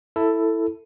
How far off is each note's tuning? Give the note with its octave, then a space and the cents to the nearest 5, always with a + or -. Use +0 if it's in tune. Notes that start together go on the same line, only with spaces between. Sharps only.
E4 +0 A4 +10